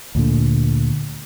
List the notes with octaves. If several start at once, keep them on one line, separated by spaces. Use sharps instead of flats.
D2 A#2 D3